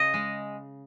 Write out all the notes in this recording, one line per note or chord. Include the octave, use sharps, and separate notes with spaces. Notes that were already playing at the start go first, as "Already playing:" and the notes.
Already playing: C#3 D#5
G#3